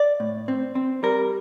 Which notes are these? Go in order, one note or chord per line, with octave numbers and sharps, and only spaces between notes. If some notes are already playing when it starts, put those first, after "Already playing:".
Already playing: D5
A2
C4
C4
G3 A#4